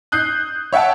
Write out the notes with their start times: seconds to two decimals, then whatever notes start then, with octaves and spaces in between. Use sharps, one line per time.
0.12 D#6 F#6 G6 C7
0.73 C#5 E5 F#5 G5 A5